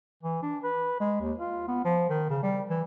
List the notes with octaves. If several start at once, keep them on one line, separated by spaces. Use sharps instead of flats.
E3
D4
B4
G#3
D#2
F4
B3
F3
D#3
C#3
G3
E3